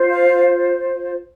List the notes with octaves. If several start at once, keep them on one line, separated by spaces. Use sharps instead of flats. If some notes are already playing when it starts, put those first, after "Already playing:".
Already playing: F4 C5
F5